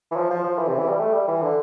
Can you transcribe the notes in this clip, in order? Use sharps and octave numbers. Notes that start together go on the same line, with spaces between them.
E3
F3
F3
F3
E3
C3
E3
G3
A3
G3
E3
D3